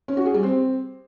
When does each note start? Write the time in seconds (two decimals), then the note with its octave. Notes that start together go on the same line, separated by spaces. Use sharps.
0.08 C#4
0.17 F#4
0.26 G#4
0.34 G3
0.43 C4